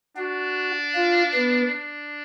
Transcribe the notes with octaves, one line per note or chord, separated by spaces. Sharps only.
D4 F#4
F4
B3
D4